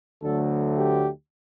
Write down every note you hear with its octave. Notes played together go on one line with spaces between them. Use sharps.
D2 D3 F#3 A3 A4
G4